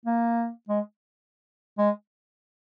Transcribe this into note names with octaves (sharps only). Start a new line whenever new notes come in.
A#3
G#3
G#3